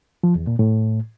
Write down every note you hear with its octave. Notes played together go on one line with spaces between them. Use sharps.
F3
E2
A#2
A2